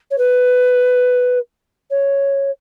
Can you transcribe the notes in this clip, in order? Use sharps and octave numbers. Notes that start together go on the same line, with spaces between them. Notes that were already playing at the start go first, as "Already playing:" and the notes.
C#5
B4
C#5